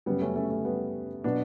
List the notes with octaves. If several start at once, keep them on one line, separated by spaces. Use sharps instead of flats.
F#2 C#3 F#3 G3 B3
A3 C#4
A3 C#4
A3
G3 B3
B2 F#3 B3 D4